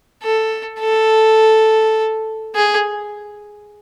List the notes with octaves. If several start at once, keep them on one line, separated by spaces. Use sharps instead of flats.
A4
A4
G#4